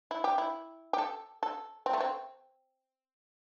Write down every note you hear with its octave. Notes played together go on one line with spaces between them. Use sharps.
E4
G4
E4
G4
A4
A4
C4
A3
C4